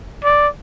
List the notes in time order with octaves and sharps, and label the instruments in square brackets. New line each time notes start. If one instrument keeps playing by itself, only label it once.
[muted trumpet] D5